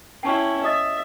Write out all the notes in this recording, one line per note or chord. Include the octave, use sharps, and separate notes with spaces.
C#4 E4 G5 A5 C#6
D#5 E5 D#6 A6